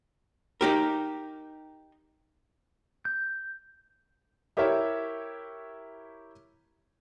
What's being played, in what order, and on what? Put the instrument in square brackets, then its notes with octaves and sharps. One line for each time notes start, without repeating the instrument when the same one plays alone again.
[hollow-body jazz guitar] D#4 G4 A#4
[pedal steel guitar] G6
[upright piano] E4 G4 A#4 C#5 E5